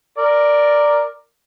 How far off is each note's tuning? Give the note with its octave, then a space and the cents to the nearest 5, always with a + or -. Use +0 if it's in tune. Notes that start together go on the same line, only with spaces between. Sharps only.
A#4 +0 D5 +5